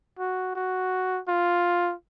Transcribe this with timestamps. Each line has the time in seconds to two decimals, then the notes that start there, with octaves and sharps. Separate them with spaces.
0.19 F#4
0.55 F#4
1.28 F4